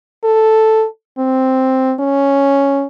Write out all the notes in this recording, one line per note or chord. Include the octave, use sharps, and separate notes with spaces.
A4
C4
C#4